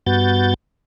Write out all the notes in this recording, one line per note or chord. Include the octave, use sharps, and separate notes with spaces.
G2 B3 F#4 G6 A6